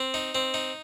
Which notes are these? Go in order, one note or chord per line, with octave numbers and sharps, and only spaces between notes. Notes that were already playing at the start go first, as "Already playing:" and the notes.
Already playing: C4
D#4
C4
D#4